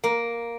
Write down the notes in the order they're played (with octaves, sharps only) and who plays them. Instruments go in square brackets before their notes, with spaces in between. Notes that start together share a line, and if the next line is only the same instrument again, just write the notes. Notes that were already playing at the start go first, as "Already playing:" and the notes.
[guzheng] A#3